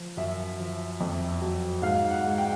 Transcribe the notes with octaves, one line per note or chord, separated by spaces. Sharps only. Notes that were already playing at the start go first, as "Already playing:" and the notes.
Already playing: F3
F#2 E5
F3
F2
F#3
G#2 F5
F#5
G#3
G5